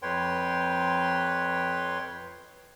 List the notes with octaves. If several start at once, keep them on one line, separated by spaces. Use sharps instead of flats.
F2 B4 C#5 G5 C6